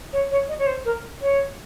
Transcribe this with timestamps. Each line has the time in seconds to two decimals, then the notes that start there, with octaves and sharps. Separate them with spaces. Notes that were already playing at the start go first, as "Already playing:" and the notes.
0.13 C#5
0.31 C#5
0.49 D#5
0.59 C#5
0.67 C5
0.85 A#4
1.22 C#5